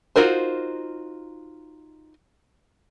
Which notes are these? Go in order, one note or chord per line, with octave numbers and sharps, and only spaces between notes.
D#4 F4 F#4 A#4 C5